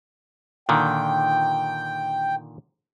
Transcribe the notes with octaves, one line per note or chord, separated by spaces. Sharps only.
A#2 D3 D#3 G5